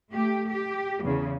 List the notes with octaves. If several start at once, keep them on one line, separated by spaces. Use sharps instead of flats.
A3 G4
G4
E2 C#3